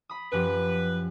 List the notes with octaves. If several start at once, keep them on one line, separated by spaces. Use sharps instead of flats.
B5 D#6
F#2 F3 G4 B4